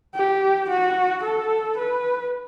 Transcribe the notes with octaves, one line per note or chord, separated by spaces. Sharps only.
G4
F#4
A4
B4